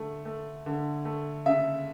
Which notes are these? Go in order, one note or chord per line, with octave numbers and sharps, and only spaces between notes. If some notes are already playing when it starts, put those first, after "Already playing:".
Already playing: D3 A3
A3
D3
A3
C#3 E5